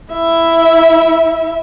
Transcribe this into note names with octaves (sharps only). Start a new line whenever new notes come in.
E4 E5